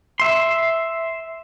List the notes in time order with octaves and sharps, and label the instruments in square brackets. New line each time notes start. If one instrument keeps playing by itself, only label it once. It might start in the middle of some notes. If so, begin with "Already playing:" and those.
[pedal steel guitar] E5 C6